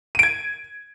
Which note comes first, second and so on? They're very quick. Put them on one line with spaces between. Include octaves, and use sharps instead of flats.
D#7 D7 G#6